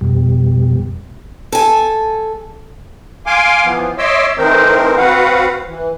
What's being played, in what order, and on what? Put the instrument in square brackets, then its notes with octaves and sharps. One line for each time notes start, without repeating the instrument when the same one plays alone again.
[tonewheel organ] F2 B2 G3
[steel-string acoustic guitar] A4 G#5
[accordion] F5 G#5 C6 D6
E3 F3 B3
C#5 D#5 E5 C6 D6 E6
E3 A3 C4 D#4 A#4 C5
C4 F#4 B4 F5 F#5
E3